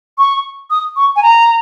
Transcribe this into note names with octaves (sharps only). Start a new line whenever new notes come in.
C#6
D#6
C#6
G#5
A#5